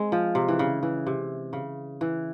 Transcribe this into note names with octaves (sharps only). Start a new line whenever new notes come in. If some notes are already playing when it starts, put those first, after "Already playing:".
Already playing: G#3 C4
F3
C3
E3
C#3
E3
C3
C#3
E3